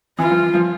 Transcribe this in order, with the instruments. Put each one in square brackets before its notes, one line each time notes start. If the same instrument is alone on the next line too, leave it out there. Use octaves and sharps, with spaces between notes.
[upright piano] E3 [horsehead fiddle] F4
[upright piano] F3
F3